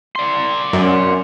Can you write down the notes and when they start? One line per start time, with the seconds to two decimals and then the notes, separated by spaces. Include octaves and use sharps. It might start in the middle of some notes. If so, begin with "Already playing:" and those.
0.16 D5 C6
0.73 F#2